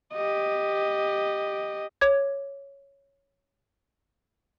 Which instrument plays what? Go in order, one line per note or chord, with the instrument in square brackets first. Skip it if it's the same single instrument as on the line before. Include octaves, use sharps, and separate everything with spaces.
[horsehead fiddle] G4 D#5
[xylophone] C#5 D6 G#6